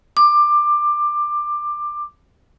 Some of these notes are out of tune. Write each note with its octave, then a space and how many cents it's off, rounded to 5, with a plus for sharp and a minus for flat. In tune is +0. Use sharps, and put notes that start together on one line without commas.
D6 +15